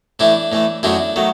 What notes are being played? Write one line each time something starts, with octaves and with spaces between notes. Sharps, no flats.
A2 E3 A3 D4 E4
A2 E3 A3
F#2 D#3 F#3 A3 D4 E4
D#3 F#3 A3